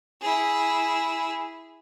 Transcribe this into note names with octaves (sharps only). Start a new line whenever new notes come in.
E4 G#4